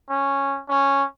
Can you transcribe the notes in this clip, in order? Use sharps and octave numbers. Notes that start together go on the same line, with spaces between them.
C#4
C#4